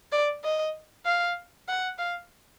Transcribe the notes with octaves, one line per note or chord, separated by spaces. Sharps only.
D5
D#5
F5
F#5
F5